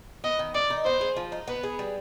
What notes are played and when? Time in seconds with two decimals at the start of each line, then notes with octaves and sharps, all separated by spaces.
0.24 B3 D#5
0.39 D#3
0.54 D#3 D5
0.70 D#4
0.86 B3 C5
1.01 G#4
1.16 F3
1.32 D#4
1.48 B3 B4
1.63 G#4
1.79 G3